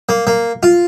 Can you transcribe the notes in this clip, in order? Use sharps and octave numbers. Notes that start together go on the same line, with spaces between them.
A#3
A#3
F4